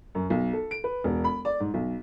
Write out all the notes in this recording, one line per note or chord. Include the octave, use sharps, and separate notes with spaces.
F#2
B1
A4
D7
B4
E1
B5
D5
G#2
B1